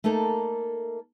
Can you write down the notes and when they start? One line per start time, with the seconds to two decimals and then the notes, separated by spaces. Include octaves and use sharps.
0.04 A3 A#3 D#4 A4 A#4